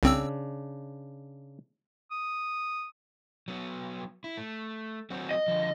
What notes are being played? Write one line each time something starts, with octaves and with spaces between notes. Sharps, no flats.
C2 C#3 C4 D4 E6
D#6
F#3 B3
E4
A3
F#3 C4 F#4
D#5
D3 F3